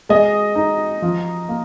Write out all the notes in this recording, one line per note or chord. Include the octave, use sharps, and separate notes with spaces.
G#3 D#5
D#4
F3
A#3